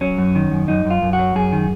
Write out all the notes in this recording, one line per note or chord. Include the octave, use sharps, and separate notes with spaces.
F#3 C#4
F#2
D#3
F#2
F#2 D#4
F#2
F4
F#2
F#4
F#3
F#2 G#4
D#3